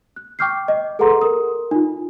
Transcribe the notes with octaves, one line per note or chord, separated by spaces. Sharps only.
F#6
G5 C#6 D6 F6 G6 C7
D#5
G#4 A4 B4 F#5 A#5 C6
A#4 D#6
D#4 F4